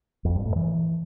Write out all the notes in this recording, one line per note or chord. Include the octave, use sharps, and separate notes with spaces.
F2
G2
A2
E3